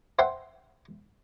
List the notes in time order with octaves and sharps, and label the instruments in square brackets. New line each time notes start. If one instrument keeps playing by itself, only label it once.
[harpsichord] C5 E5 F#5 G5 C6